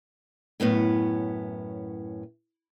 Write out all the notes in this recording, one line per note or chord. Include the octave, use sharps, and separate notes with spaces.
F#2 A2 B3 C#4